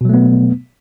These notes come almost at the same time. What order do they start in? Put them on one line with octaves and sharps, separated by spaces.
B2 F#3 A3 B3